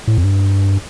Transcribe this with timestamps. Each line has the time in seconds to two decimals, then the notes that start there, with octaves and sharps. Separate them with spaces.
0.07 A2
0.18 F2
0.24 G2